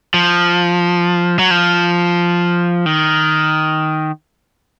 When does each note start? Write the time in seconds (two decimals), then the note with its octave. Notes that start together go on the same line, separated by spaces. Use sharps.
0.14 F3
1.39 F#3
1.51 F3
2.86 D#3